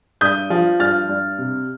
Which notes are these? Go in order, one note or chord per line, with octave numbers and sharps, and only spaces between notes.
G2 D#6 G6
F3
G2 F6 A6
G2
C3